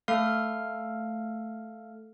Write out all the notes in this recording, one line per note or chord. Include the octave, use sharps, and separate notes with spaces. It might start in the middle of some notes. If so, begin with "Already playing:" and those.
A3 A4 F5 F6